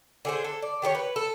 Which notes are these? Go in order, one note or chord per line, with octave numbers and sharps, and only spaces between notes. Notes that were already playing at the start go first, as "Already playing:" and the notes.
D3 G#4 C5
A4
D5
D#3 G4 G#4 C#5
B4
A4